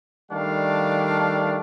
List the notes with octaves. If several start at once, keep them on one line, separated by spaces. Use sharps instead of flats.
D#3 G3 A3 D4 F5